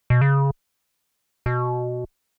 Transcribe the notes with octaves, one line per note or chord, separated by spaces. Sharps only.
B2
C#3
B2